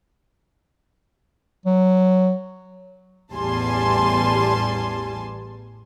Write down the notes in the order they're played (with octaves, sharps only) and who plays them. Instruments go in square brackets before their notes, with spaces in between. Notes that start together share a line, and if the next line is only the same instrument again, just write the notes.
[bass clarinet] F#3
[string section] A1 E2 G3 G#5 A5 C6